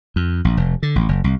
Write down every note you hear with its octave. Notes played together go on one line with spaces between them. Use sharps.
F2
A#1
F1
D3
A1
F#1
C2